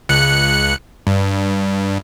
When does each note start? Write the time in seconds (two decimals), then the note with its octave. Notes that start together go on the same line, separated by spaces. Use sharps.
0.09 C#2 F#6 C#7
1.07 G2